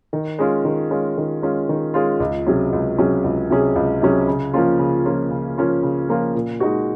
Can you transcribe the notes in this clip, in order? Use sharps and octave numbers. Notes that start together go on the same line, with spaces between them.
D#3
G#3 C#4 F4
D#3
G#3 C#4 F4
D#3
G#3 C#4 F4
D#3
G#3 C#4 F4
C#2
C3 F#3 C#4 G#4
C#2
C3 F#3 C#4 G#4
C#2
C3 F#3 C#4 G#4
C#2
C3 F#3 C#4 G#4
C#3
F3 A#3 C#4 F4
C#3
F3 A#3 C#4 F4
C#3
F3 A#3 C#4 F4
C#3
F3 A#3 C#4 F4
A#2
G#3 D#4 F#4